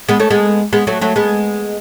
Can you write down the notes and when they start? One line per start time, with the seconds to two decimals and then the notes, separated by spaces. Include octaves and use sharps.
0.09 G#3 B3
0.20 A3 C#4
0.30 G#3 B3
0.73 G#3 B3
0.87 F#3 A3
1.01 F#3 A3
1.16 G#3 B3